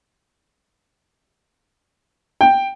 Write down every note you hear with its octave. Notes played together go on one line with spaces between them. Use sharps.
G5